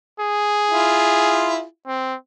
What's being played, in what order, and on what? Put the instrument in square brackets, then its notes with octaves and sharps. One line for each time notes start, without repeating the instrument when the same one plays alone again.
[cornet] G#4
[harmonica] E4 F4
[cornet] C4